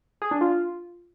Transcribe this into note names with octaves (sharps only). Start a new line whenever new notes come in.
G#4
D4
F4